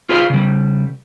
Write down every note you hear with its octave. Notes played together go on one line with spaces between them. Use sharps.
F4 G#4 B4 C5 D5 F5
C#3 G3